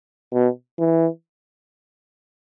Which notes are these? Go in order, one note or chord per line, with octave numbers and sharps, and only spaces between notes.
B2
E3